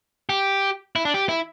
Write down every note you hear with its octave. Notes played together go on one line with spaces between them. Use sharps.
G4
E4
D4
G4
E4